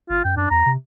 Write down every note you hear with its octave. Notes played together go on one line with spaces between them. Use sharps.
G1 F4
F#2 G5
F#2 D4
E2 A#5
C3